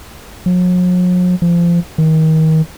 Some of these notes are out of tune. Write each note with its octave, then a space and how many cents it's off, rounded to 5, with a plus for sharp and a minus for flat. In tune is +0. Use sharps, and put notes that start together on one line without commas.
F#3 -45
F3 -25
D#3 +30